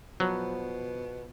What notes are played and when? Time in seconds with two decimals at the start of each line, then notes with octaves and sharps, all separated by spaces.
0.20 B2 F3 F#3 B3